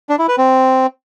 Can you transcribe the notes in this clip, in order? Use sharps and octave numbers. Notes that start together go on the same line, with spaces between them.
D4
E4
B4
C4